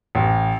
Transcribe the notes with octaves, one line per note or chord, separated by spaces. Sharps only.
A1